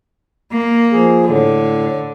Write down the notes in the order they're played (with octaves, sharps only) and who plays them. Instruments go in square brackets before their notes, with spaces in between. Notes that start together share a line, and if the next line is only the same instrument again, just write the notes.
[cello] A#3
[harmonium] F3 G#4
[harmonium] A2 [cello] D3